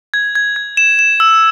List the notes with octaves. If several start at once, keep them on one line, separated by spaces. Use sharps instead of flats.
G#6
G#6
G#6
E7
E7
E6